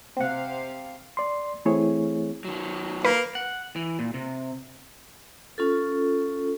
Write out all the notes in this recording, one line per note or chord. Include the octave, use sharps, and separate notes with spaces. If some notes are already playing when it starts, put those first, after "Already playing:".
C3 C4 F5 F#5
D5 C6
E3 A3 C4 E4 G#4 C#5
D#3 F#3
A#3 B4
F#5
E3
A#2
C3
C#4 F4 A4